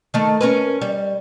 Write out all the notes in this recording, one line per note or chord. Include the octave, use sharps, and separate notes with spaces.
D#3 A3
C#4 A#4 B4
G3